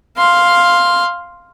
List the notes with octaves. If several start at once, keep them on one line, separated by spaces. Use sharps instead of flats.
F5 C6